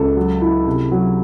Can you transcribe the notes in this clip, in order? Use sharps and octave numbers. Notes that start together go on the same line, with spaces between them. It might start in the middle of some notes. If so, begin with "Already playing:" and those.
Already playing: C#2 A4
F#3
E4
C3
F#3